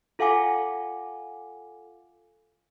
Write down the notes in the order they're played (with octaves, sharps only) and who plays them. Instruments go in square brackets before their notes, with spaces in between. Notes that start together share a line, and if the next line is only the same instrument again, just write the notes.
[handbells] F4 A4 F5 F#5 G#5 D6